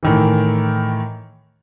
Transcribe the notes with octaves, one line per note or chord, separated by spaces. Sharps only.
A2 D#3 E3